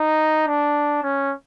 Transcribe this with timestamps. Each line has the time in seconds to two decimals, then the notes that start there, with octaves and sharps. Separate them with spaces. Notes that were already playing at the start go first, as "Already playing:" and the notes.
Already playing: D#4
0.47 D4
1.03 C#4